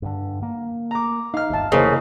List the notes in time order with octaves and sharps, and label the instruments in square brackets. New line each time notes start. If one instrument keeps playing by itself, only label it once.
[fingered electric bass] G2 D3
A#3
[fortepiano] A#5 D6
[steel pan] D#4 [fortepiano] F5 F6
[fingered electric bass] G1 D#2 [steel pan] E5 A5
[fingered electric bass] F1 [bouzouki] C#3 [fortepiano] E3 A#3 [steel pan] G#4 C5 D#5